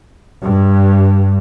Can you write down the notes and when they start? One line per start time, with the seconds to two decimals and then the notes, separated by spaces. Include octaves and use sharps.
0.42 G2